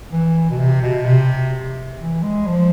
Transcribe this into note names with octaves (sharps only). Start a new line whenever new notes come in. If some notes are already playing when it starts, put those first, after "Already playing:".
E3
B2
C3
B2
C3
E3
G#3
F3